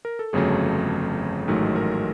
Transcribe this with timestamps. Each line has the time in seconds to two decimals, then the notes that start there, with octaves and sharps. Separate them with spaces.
0.05 A#4
0.19 A4
0.33 G1 F2 C#3 F#3 A3 G#4
1.48 A1 G#2 D#3 F#3 A3
1.76 A#4